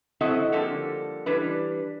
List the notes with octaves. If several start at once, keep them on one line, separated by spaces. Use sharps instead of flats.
F#3 C4 E4 F#4 A4 D#5
D3 F3 G3 A#3 A4
E3 G3 D4 B4